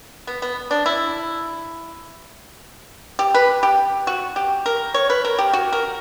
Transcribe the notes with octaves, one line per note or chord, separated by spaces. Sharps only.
B3
B3
D4
E4
G4
B4
G4
F#4
G4
A#4
C#5
B4
A#4
G4
F#4
A#4